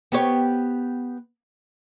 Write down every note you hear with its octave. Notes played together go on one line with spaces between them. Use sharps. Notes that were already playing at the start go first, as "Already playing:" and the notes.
B3 G4 C#5